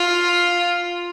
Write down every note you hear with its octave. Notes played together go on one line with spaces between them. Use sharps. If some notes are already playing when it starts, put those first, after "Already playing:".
Already playing: F4